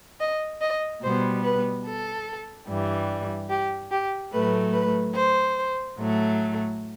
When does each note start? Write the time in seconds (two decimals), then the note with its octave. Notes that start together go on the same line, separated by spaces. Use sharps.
0.19 D#5
0.61 D#5
1.02 B2 G3 B3 C5
1.43 B4
1.85 A4
2.67 G2 E3 G3
3.49 G4
3.91 G4
4.32 A2 F#3 A3 B4
4.73 B4
5.14 C5
5.97 A2 F#3 A3